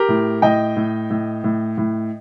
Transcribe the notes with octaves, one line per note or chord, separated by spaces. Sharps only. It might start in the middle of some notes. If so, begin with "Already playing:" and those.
Already playing: G4 A#4
A2
A2 D#5 G5
A2
A2
A2
A2